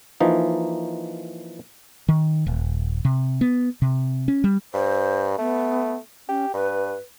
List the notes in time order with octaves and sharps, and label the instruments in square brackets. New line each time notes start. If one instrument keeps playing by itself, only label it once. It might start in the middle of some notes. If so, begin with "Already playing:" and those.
[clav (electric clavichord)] E3 F3 A#3 D#4
[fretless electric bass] D#3
D#1
C3
B3
C3
C#4
G3
[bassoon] G2 [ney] C5
[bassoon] A3 [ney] B3
[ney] C#4 [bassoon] G4
[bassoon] G2 [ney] B4